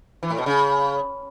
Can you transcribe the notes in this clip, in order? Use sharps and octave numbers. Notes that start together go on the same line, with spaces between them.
E3
A2
B2
C#3